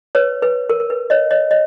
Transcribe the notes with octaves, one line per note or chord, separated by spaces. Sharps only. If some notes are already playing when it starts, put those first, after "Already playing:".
B4 C#5
B4
A#4
A#4
B4
C#5 D#5
C#5 D#5
C#5 D#5